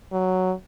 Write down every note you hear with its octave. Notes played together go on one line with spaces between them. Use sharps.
F#3